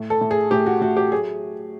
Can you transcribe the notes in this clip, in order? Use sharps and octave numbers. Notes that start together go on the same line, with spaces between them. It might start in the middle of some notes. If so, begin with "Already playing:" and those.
Already playing: A2
A4
A2
G#4
A2 G4
F#4
A2 F#4
G4
F#3 G#4